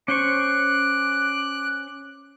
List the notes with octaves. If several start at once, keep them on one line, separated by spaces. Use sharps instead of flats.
C#4 C5 C#6 D6 F#6